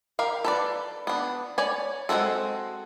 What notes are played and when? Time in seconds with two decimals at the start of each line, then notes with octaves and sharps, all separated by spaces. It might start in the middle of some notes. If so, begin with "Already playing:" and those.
0.19 G4 A#4 F5
0.44 A4 B4 D5
1.07 B3 D4
1.58 C#5 D5 G#5
2.09 G#3 C4 F4 F#4 A4